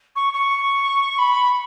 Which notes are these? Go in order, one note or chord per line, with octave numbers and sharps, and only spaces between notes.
C#6
C#6
B5